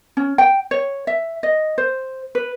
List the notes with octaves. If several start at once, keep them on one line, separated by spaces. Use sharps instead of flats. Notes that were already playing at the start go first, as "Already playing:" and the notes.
C#4
G5
C#5
E5
D#5
C5
B4